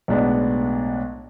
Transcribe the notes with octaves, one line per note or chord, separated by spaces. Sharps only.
B1 A2 G#3 B3 D4